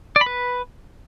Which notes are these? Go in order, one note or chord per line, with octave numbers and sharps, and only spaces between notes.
D5
B5
B4